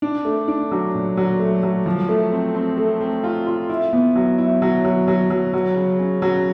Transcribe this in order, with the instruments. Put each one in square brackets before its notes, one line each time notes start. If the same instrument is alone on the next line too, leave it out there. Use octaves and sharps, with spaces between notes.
[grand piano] D4
A3
D4
F#3
A#2
F#3
A3
F#3
F3
A3
C4
C4
A3
C4
F4
F4
E4
B3
F#3
E4
F#3
F#3
F#3
F#3
F#3
C#3
C#4
F#3